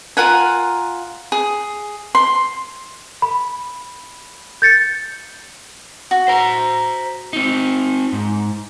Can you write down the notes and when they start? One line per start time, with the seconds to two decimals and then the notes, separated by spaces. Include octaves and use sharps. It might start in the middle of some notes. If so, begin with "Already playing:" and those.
0.17 F4 A#4 F#5 G#5
1.32 G#4
2.15 C6
3.22 B5
4.62 G6 A6 C#7
6.11 F#4
6.28 C5 A#5
7.33 C4 D#4
8.13 G#2